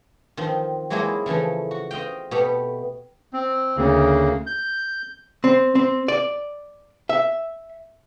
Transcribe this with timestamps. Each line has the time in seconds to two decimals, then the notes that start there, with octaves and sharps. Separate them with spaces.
0.37 D#3 F3 C4
0.90 F#3 G#3 A#3 D#4 E4 G#4
1.26 C#3 E3 F3 A3
1.71 F#4
1.91 C4 D#5 F5 G5
2.31 B2 A3 B3 G4
3.33 C4
3.77 D2 C#3 A#3
4.47 G6
5.44 C4
5.75 C4
6.08 D5
7.09 E5